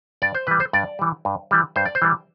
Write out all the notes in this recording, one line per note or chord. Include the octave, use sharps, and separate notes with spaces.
G2 D5
C5
E3 G3 B4
C5
G2 D5
E3 G3
G2
E3 G3
G2 C5
D5
C5
E3 G3